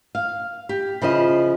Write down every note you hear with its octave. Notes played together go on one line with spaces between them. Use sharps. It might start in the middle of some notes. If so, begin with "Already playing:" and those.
F5
G4
C#3 F3 E4 C5 D#5